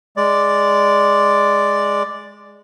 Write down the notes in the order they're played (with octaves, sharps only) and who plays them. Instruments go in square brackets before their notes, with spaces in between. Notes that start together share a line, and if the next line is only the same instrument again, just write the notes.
[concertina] G#3 D5